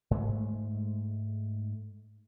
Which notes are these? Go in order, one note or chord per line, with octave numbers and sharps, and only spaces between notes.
G#2 G#3 A3